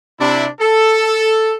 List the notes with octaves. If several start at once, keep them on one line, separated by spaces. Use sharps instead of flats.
C3 D4 E4
A4